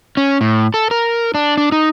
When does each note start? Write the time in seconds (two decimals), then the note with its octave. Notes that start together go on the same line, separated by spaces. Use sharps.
0.17 C#4
0.41 A2
0.74 A4
0.91 A#4
1.35 D4
1.58 D4
1.72 D#4